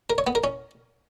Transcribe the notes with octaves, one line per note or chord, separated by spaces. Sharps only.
A#4
C#5
B3
A#4
C#4